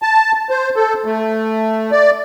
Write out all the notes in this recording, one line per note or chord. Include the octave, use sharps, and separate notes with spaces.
A5
C5
A4
A3
D5